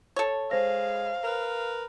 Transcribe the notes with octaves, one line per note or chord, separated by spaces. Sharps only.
A4 C#5
G#3 C5 F5 A#6
A#4 B4